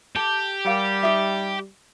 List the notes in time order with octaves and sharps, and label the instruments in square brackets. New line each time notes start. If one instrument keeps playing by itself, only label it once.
[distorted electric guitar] G4 [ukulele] A4 A5
[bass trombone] G3 [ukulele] A#4 F5 F#5
[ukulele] D#4 G#4 E5